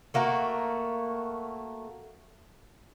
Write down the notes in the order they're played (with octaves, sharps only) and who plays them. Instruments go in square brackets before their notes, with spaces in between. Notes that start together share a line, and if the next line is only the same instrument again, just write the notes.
[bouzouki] A3 A#3 F#4 A#4